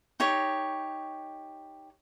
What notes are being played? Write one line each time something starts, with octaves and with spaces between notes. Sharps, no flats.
D#4 G4 C#5